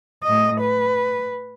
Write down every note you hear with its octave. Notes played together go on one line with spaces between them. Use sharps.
A2 D#5
B4